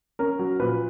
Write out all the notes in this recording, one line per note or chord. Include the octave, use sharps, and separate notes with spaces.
C#4 A#4
F#3
A#2 B4